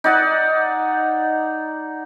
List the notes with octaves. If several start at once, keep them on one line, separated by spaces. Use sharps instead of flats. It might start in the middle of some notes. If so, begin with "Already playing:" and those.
D#4 D5 F#5